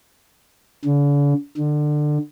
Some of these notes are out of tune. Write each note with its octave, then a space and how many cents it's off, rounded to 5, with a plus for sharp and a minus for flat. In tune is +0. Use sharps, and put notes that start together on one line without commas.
D3 -45
D3 +20